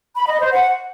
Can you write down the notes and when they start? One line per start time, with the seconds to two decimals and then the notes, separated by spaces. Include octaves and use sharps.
0.16 B5
0.28 D#5
0.40 C5
0.52 F#5